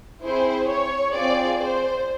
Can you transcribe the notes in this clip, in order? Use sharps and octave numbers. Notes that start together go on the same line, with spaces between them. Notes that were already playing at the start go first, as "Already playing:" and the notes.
C4 E4 G#4 C5
C#5
C4 F4 G#4 D5
C5